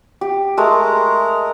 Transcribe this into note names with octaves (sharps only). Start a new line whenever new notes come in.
G4
G#3 A3 A#4